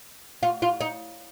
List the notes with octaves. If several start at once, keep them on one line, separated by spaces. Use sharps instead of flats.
F4
F4
D#4